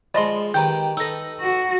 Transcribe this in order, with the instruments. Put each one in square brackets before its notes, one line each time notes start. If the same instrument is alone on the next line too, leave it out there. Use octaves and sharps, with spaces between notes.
[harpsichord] F3 G#3 [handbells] D5 D#5 C6 [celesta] B5
[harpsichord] D#3 G4 B4 [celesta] G5 A#5 [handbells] G6
[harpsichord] D#4 A4 B4 [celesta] E6 A#6
[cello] F#4